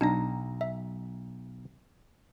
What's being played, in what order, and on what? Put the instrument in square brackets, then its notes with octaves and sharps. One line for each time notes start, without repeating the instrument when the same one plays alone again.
[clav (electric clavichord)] B1 A#5 [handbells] D4 D#4
[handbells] E5